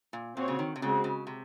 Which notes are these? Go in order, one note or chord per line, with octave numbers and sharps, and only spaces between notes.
A#2
A#2 C4 F#4 C#5
C#3
D#3
C3
C#3 G#3 C4 F#4
C#3
C3